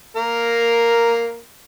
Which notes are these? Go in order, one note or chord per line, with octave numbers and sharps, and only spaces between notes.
A#3 A#4